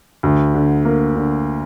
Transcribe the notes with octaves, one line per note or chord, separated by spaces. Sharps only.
D2
D3
A#3
D3